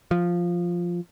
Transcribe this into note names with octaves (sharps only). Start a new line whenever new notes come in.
F3